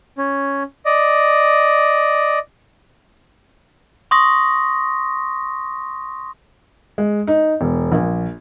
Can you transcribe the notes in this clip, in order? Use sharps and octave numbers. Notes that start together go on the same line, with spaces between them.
C#4
D5 D#5
C6 C#6 D#6 A#6
G#3
D#4
E1
A#1